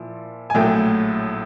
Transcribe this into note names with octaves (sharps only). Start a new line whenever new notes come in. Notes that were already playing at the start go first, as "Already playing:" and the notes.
Already playing: A#2 F3 E4
G#5
A#1 A2 F#3 A3 G5